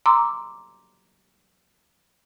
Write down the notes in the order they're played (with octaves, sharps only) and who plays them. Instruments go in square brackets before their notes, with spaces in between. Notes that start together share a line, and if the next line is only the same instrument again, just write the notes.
[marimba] A#5 C6 D6 E6